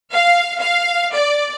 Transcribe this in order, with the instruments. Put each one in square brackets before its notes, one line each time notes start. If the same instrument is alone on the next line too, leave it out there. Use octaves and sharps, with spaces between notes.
[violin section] F5
F5
D5